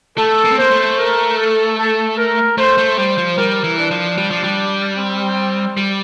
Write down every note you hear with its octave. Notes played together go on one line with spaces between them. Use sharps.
A3 A4
A#3
C4
A#3 C5
A3
A#4
A4
A4
A#4
A3 C5
A3
G3 C5
F3
G3 A#4
E3
D4
F3
G3
F3
G3
C4
G3